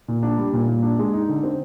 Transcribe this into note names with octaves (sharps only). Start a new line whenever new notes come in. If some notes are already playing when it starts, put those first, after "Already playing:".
A#2
D4
G3
A#2
A#2
D4
G#3
D#4
D3
C4